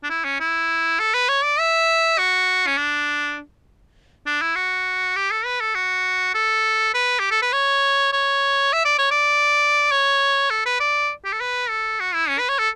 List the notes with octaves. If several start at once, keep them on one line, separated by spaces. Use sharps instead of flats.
D4
E4
C#4
E4
A4
B4
C#5
D5
E5
F#4
C#4
D4
D4
E4
F#4
G4
A4
B4
A4
F#4
A4
B4
G4
A4
B4
C#5
C#5
E5
D5
C#5
D5
C#5
A4
B4
D5
G4
A4
B4
A4
F#4
E4
C#4
B4
C#5
A4